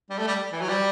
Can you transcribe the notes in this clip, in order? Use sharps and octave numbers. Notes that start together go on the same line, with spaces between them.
G3
A3
G3
E3
F#3
G3